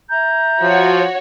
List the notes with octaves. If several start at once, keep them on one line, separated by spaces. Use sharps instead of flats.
E5 A#5 G6
F3 F#4 C#5